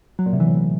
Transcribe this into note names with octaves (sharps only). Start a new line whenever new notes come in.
F#3
A#2
C3
E3
A2